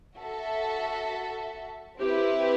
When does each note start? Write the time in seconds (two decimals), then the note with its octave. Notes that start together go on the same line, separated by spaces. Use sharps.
0.18 F#4 A4 E5
2.00 C4 E4 G4 B4